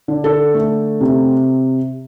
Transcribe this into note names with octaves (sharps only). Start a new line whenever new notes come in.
D3
A4
A3
C3